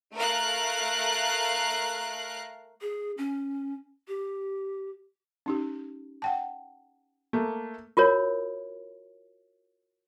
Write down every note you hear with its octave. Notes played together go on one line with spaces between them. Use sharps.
A3 A#4 F5 F#6
G#4
C#4
G4
C#4 D#4 G4
F#5 G5 A5
A3 A#3
F4 F#4 A#4 C#5